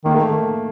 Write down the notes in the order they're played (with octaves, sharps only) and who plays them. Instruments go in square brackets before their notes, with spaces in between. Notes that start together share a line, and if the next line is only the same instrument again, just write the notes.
[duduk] D#3 [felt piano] A#3
[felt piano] A3